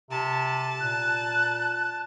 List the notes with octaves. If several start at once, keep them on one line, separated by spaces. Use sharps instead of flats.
C3 A5
A#2 F#6